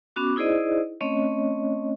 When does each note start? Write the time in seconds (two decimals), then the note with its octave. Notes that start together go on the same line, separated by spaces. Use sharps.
0.16 B3 C#4 F#4 D6
0.36 D#4 E4 G#4 C5 D5 D#5
1.01 A3 C4 C#4 C#5 D#5